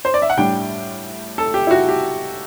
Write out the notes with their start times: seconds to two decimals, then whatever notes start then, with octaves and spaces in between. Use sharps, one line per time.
0.05 C5
0.14 D5
0.22 E5
0.30 F#5
0.37 A2 G3 D4 G5
1.38 A4
1.54 G4
1.67 E4
1.71 F#4
1.89 G4